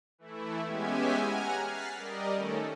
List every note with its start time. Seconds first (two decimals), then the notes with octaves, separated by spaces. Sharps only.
0.18 E3 A3 E4
0.64 G#3 B3 C#4 G4 E5 G#5
1.20 F#5 G#5 A#5 F6
1.64 F6 F#6 A6 B6 C7
1.95 G3 A#4 D5 D#5
2.34 D#3 A3 C#4 A4